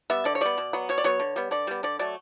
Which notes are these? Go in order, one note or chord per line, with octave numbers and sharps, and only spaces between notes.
G3 B3 E5
D3 D5
C#5
G3 B3 D5
B2
F#3 B3
B2 C#5
D5
F#3 B3 C#5
D3
G3 B3
D3 D5
G3 B3
D3 D5
F#3 A3 D5